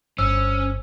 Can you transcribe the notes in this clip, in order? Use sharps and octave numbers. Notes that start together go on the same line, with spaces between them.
G1 C#4 C5 E6